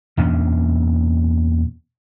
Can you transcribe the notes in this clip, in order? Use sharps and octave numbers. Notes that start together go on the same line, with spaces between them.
E2 A#2 C#4 D4